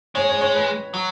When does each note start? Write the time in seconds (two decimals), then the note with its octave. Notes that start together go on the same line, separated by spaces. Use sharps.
0.15 G#3 C#5
0.29 C#5
0.41 C#5
0.55 B4
0.94 F#3